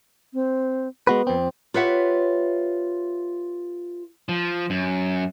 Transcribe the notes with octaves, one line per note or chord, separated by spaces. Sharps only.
C4
G#3 B3 F#4 B4
F2 C4
F4 G4 B4 C#5 E5 F#5
F3
F#2